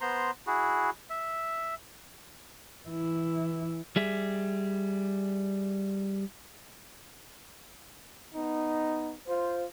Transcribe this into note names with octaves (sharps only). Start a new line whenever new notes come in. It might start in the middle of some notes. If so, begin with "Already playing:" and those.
B3 C5 A#5 C6
E4 F#4 G#4
E5
E3 E4
G3 G#4 E5
B3 D#4
F4 C5